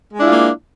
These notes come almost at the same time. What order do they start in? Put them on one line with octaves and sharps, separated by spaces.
G#3 D4 E4 F4 A#3